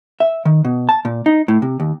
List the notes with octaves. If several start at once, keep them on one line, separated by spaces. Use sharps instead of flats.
E5
D#3
B2
A5
A#2
D#4
A2
C3
D#2